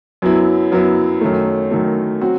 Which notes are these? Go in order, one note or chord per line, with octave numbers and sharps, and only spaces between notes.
F#2 F#3 B3 E4
F#2 F#3 B3 E4
F#2 D#3 F#3 A3
F#2 D#3 F#3 A3
F#3 C4 F#4